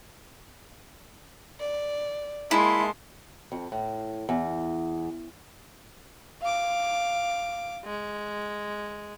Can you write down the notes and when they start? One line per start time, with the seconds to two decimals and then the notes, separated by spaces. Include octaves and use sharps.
1.60 D5
2.51 G#3 A#3 E4 A5 C6
3.52 F2
3.72 A2
4.29 E2
6.42 F5 D6
7.85 G#3